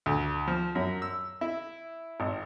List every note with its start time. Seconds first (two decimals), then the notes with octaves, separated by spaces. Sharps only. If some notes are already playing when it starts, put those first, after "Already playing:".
0.06 D2
0.47 F3
0.75 F#2
1.02 E6
1.41 E4
2.20 G#1